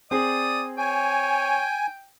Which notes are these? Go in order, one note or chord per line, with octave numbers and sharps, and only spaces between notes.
C4 G#4 D5 D#6
C#5 G5 G#5